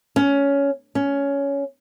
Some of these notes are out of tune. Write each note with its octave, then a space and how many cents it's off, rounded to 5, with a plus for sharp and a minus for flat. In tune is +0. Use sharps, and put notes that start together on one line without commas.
C#4 +15
C#4 +15